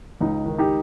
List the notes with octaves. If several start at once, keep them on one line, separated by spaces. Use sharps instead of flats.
C#2 D#4
D#3
D#4 G4